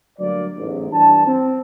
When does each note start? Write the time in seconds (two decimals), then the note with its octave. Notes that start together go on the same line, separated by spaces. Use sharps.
0.19 D2 G2 F#3 A#3 D5
0.58 A1 E2 G#2
0.92 G2 E3 D4 D5 A5
1.26 C4